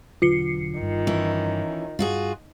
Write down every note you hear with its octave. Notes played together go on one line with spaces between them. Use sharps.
E1 D3 F#3 F4 C7 C#7
G1 G2 D#3
E3 C#4
G2 F4 F#4 G#4